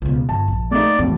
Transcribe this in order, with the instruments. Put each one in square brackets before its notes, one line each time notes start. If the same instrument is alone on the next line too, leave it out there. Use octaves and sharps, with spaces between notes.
[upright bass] C#2 B2
[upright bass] G1 [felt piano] A5
[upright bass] A#1
[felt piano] A3 A#3 D#4 [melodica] D5
[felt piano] E1 A2 [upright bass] E2